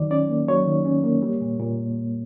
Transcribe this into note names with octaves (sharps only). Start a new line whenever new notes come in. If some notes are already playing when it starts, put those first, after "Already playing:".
Already playing: D#3 F#3 D5
C#4 D5
A#3
F#3 C#5
D#3
C#4
A#3
G3
A#2
A#2